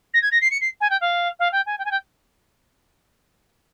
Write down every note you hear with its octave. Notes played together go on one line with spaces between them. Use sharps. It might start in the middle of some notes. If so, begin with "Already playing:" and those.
A#6
G#6
A#6
C7
C#7
C7
G#5
G5
F5
F5
G5
G#5
G5
G#5
G5